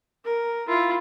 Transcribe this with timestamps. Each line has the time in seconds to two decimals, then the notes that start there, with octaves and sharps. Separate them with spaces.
0.25 A#4
0.67 E4 F4